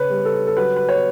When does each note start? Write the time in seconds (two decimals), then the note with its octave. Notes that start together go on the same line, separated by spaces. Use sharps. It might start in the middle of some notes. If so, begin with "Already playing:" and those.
Already playing: C#3 B4 C#5
0.10 G3
0.25 A4
0.47 A4
0.56 F#3 B4
0.76 B4
0.89 C#5